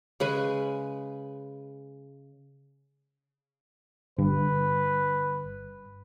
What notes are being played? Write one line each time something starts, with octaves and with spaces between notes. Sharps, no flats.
C#3 G#3 B4 G#5
G1 G2 D3 B4